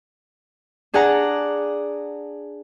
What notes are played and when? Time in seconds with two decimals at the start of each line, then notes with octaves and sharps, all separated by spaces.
0.94 D4 G#4 D5 F#5 A#5